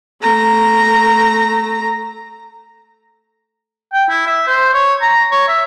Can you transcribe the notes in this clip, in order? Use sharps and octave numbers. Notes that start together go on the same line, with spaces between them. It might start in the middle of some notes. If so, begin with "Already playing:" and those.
A3 A#5
G5
E4
E5
C5
C#5
A#5
C#5
E5